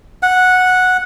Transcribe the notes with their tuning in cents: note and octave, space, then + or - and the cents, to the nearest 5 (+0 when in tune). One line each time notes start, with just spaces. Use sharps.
F#5 -10